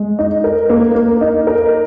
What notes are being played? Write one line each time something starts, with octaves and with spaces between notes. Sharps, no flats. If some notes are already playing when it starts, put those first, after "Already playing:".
Already playing: G#3
D#4
A#4
A#3
A#3
D#4
A#4